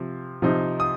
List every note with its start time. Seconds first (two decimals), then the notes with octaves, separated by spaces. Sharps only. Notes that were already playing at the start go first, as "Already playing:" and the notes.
Already playing: C3 F3 C4
0.42 C3 F3 C4 D#4
0.80 D#6